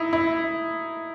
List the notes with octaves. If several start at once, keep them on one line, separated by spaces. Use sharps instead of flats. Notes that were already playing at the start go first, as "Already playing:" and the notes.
Already playing: D#4 E4
E4